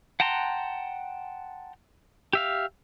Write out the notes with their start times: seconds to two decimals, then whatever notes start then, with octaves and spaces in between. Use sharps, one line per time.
0.20 F#5 G5 A5 A#5 C6
2.33 G4 E5 F5